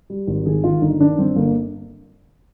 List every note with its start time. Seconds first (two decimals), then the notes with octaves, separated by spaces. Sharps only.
0.10 G3
0.27 G#1
0.46 D#3 G#4
0.64 D#3 F4
0.81 G1 D#4
1.00 D#3 D4
1.19 G2 C4
1.36 G1 A#3